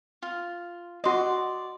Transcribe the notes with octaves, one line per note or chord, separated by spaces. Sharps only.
F4
F#4 D5 D#5 C6